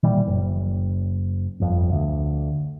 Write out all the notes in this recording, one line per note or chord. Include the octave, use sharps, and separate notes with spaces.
A#2 D#3 E3 G3
F#1
G1 F2
D2